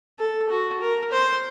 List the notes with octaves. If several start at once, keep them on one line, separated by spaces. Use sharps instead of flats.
A4
F#4
A#4
C5